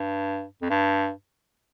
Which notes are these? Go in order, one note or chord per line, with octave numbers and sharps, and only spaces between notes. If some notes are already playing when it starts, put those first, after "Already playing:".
Already playing: G2
F2
G2